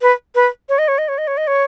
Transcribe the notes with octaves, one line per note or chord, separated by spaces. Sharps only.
B4
B4
C#5
D#5
C#5
D#5
C#5
D#5
C#5
D#5
C#5